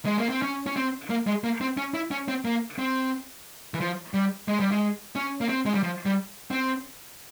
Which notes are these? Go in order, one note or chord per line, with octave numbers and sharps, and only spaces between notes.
G#3
A#3
C4
C#4
C#4
C4
A#3
G#3
A#3
C4
C#4
E4
C#4
C4
A#3
C4
E3
F3
G3
G#3
G3
G#3
C#4
A#3
C4
G#3
G3
F3
G3
C4